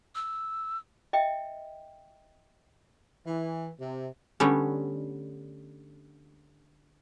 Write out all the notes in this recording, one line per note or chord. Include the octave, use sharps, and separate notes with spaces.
E6
D#5 E5 G5
E3
C3
D3 G3 A3 B3 C#4